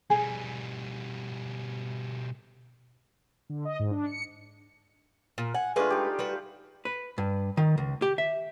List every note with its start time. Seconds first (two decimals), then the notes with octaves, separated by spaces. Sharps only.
0.10 B2 G3 G#4
3.49 D3
3.65 D#5
3.80 G#2
3.91 D4
4.06 C#7
5.38 A#2
5.54 F#5 G#5
5.76 G#3 A3 D4 F4 B4
5.90 D#4 G4
6.19 G3 F#4 B4
6.85 B4
7.18 G2
7.57 D#3
7.78 C#2
8.02 G4
8.18 E5